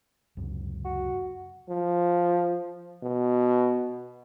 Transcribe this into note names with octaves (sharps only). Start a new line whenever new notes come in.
C#2 F#2 C3
F#4
F3
B2